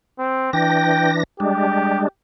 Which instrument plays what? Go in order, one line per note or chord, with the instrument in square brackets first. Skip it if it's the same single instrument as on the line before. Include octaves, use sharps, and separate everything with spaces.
[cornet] C4
[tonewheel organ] E3 D4 A#6 [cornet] G5
[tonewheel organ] G3 G#3 D4 [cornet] G4